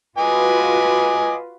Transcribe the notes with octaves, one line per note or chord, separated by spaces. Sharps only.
F4 F#4 B4 D#5 G#5 D6